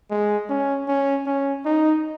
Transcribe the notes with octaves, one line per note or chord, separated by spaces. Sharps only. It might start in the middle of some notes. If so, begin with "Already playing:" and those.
G#3
C#4
C#4
C#4
D#4